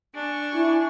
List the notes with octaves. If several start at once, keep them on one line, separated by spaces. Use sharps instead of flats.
D4 G#5 C#6
E4